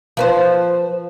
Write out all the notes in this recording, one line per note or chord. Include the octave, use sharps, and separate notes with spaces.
F3 B4 C5